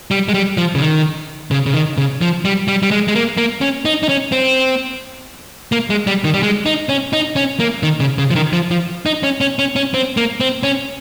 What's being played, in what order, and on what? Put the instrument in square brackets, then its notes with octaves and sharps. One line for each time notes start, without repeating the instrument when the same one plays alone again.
[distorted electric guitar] G3
G#3
G3
F3
C#3
D#3
C#3
C#3
D#3
C#3
F3
G3
G3
G3
G#3
G#3
A#3
A#3
C#4
D#4
D#4
C#4
C4
A#3
G#3
G3
D#3
G3
G#3
D#4
C#4
D#4
C#4
A#3
D#3
C#3
C#3
F3
D#3
F3
F3
D#4
C#4
C#4
C#4
C#4
C4
A#3
C4
C#4